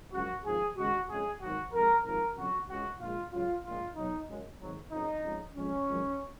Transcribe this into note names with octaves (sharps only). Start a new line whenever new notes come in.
F#2 C#3 F3 G#3 F#4
G#1 G#2 F3 G#4
D#2 C#3 G#3 F#4
F2 C#3 G#3 G#4
G#1 G#2 F#3 F#4
F2 F3 G#3 A#4
G#1 G#2 F3 A#4
F2 C#3 F#3 F#4
C#2 C#3 G#3 F#4
A#1 A#2 G#3 F4
C#2 C#3 F#3 F4
A#1 A#2 G#3 F4
B1 B2 F#3 D#4
F#2 C#3 G#3
G#1 G#2 F#3
F#1 F2 C#3 F3 D#4
F2 C#3 G#3
F2 F3 G#3 C#4
G#1 F#2 F3 G#3